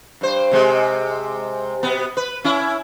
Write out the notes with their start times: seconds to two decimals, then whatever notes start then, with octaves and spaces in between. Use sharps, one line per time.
0.21 G2 C5
0.51 C3 G#3
1.83 B2 B3
2.17 B4
2.44 C#4 E4